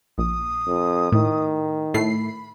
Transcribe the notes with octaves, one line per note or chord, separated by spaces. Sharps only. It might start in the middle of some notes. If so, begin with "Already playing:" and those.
A#1 D#6
F2
A2 D#3
A2 A3 B5 C7